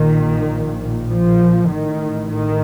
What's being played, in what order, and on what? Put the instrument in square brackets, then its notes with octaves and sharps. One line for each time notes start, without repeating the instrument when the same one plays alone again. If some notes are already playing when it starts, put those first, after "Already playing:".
Already playing: [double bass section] A#1 A#2 D#3
F3
A1 A2 D#3
D#3